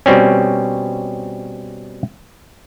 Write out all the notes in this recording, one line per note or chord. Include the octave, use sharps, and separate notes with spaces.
B2 G3 C4 C#4